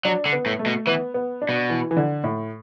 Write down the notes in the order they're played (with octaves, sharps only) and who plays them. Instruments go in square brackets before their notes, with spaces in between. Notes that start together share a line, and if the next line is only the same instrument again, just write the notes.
[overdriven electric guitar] F#3 [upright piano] D4
[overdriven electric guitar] D3
[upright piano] B3
[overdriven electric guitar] A2
[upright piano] A3
[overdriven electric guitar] B2
[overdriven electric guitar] E3 [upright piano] B3
[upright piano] B3
D4
[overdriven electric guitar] B2
[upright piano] E3
E3
D3
A2